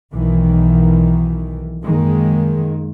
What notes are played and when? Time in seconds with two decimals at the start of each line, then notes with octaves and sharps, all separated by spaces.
0.12 B1 D#3 E3
1.84 F#2 D#3 G#3 A#3